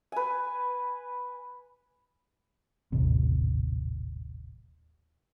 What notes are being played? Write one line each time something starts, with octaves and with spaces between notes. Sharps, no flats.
B4 G#5
D#1 A1 C3